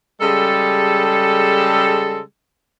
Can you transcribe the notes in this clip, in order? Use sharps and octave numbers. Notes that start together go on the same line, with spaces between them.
C#3 G3 G#3 A4